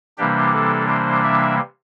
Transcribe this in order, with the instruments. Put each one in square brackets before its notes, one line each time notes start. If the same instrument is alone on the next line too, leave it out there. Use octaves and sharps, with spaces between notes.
[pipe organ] C3 E3 G3 A#3 D4 G4
A4
C5
E5